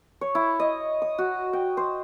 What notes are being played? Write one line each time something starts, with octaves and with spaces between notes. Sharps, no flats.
C#5
E4
D#5
D#6
F#4
G5
C5